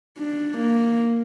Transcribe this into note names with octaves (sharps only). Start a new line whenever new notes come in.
D4
A#3